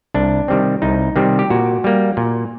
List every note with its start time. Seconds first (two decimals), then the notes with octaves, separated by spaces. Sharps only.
0.14 C2 D4
0.48 C3 D#3 G3 C4
0.82 C2 D#4
1.16 C3 D#3 G3 C4
1.39 G4
1.50 A#2 F#4
1.84 G3 A#3
2.17 A#2